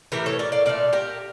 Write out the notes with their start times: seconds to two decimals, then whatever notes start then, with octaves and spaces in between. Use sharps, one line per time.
0.12 A2 E3 A3 G4 A#4
0.26 A4 C#5
0.39 A#4 D5
0.52 D5 F5
0.66 A#2 A3 D5 F5
0.93 G4 A#4